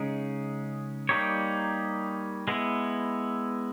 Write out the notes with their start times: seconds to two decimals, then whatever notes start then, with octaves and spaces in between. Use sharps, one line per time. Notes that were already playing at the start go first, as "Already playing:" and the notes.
Already playing: C#3 G#3 D#4
1.09 G3 A#3 D#4 G4 C#5
2.48 G#3 B3 E4